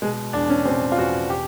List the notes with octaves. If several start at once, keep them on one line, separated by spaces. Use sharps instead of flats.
B2 G#3
E2 D4
C#4
B2 C4
F4
E2 F#4
G4